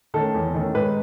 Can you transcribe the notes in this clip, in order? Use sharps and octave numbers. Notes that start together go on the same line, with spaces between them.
D#3 A3 C#4 A4
E2
D#3 A3 C#4
G#2 B4